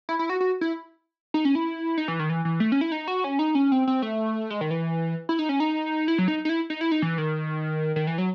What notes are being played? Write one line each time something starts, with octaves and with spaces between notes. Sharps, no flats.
E4
E4
F#4
F#4
E4
D#4
C#4
E4
D#4
E3
D#3
E3
E3
A3
C#4
E4
D#4
F#4
C#4
D#4
C#4
C4
C4
A3
G#3
D#3
E3
E4
D#4
C#4
D#4
E4
F#3
D#4
D#4
E4
D#4
E4
D#4
E3
D#3
D#3
E3
F#3